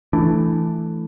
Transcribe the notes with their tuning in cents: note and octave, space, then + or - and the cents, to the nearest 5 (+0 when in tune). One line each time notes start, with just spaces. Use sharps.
E3 +5 A3 +0 D4 +0